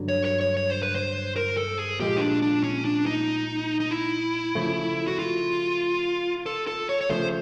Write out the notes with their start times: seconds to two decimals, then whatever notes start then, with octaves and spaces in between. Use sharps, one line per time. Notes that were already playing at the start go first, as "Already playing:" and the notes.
Already playing: G2 D3 F#3
0.08 C#5
0.25 C#5
0.41 C#5
0.57 C#5
0.70 C5
0.82 B4
0.95 C5
1.36 A#4
1.57 A4
1.79 G#4
1.99 A#2 F3 G#3 G4
2.17 D#4
2.21 D4
2.42 D4
2.63 C#4
2.85 D4
3.06 D#4
3.80 D#4
3.91 E4
4.55 C#3 F3 A3
5.07 F#4
5.19 F4
6.46 A4
6.67 A4
6.89 C#5
7.01 C#5
7.10 C#3 F3 A3 C5